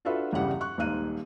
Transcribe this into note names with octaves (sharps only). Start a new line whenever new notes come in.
D4 F4 F#4 A4 B4 E5
G1 E2 C#3 G3 G4 F#5
C#6 F#6
D#1 G#2 F5 F#6 D#7